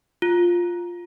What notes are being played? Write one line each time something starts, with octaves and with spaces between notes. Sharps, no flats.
F4